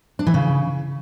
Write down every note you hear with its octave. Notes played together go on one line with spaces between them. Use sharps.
D4
E3
C#3